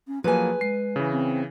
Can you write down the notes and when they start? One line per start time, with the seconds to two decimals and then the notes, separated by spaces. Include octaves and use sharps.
0.07 C#4
0.24 F3 F#3 A#3 G#4 B4 G#5
0.61 G#3 C7
0.96 C#3 E3
1.11 C4